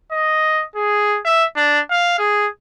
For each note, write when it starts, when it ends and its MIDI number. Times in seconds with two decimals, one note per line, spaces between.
0.12 0.63 75
0.76 1.18 68
1.25 1.44 76
1.56 1.79 62
1.90 2.18 77
2.19 2.47 68